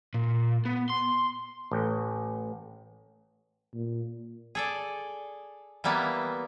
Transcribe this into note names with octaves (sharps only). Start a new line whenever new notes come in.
A#2
B3
C6
A1
A#2
G#4 A4 D5
E3 G3 A#3 B3 E4